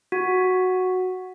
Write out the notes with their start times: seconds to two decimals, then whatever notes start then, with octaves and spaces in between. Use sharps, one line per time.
0.12 F#4